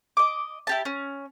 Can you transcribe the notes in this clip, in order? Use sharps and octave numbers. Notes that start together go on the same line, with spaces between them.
D#5 D6
E4 G4 A5
C#4